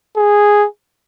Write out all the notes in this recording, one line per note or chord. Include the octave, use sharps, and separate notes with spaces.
G#4